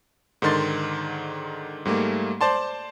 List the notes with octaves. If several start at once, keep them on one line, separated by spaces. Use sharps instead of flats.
G#2 D3 D#3 C6 A6
G#2 G3 A3 A#3
C5 D5 A5 C6